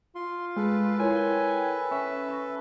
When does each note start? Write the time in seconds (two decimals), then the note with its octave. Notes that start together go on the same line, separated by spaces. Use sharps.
0.15 F4 C6
0.57 G#3 A4 B4
0.99 E4 A#4 C#5 G#5
1.16 G5
1.91 C#4 E5 G#5 B5 B6
2.29 B5 C#6 A#6